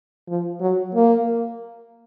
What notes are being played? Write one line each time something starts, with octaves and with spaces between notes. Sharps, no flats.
F3
F#3
A#3